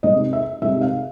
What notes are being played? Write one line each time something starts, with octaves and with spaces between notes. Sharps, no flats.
C3 D#3 G#3 D#5
E5
C3 D#3 G#3 E5
F5